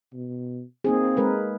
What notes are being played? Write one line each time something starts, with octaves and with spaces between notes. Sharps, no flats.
B2
A#3 C4 D#4 G#4
G#3 A#4 B4